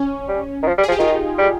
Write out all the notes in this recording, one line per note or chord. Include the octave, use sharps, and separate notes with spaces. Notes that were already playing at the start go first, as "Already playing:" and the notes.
Already playing: C#4
G3
D#3
F3
G3
G#4
F3
G4
D#3 F4
D#4
G3